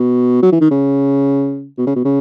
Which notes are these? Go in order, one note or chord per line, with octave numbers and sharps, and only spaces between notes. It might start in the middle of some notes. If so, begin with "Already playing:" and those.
Already playing: B2
F#3
E3
D#3
C#3
B2
C#3
B2
C#3